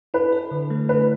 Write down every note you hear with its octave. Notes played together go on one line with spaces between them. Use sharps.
E4 B4
A4
D3
A3
E4 B4